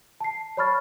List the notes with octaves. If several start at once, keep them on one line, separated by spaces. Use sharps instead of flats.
A5 C7
C#5 D5 B5 C#6 F6 A6